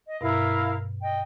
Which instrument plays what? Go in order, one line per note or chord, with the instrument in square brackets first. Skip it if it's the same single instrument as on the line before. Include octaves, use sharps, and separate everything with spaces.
[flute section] D#5
[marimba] G2 B2 [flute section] E4 A#4 F5
[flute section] D#5 G5